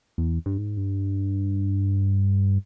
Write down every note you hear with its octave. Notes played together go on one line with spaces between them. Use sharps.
E2
G2
G#2
G2